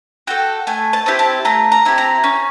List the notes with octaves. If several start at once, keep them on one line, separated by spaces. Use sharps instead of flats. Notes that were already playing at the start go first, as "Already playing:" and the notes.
F#4 A4 G5
A3 G#5
A5
C4 E4 G4
A5
A3 A#5
A#5
C4 E4 G4
A#5
C#4